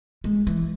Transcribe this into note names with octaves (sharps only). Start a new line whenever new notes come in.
G#3
E3